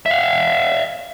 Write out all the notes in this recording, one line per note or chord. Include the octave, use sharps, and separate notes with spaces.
E5 F5